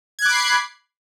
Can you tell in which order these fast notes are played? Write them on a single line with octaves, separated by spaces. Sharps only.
G#6 F#6 D6 B5 C7